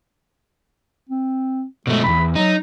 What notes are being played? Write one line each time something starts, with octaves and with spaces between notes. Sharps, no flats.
C4
B2 G#3 A3
B1 E2 B5
F#3 D#4